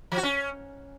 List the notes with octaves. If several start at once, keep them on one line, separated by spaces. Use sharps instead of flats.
F3
F#4
C#4